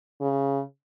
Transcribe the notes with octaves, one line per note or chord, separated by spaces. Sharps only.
C#3